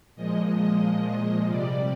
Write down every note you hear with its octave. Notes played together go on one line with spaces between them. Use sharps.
A#2 F3 G#3 D#5
C3 G3 D5